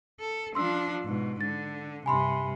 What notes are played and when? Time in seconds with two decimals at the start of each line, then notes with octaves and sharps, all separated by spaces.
0.20 A4
0.55 F3 D4 C6 E6
1.04 G#2 B2
1.41 D3 A6
2.06 G2 C3 G#5 B5 C6